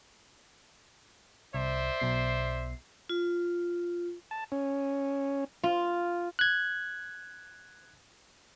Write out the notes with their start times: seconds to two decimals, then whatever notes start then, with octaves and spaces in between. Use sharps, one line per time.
1.54 C2 C5 D5 E5
2.00 B1 B2 C7
3.09 F4
4.31 A5
4.52 C#4
5.63 F4
6.39 F#6 G#6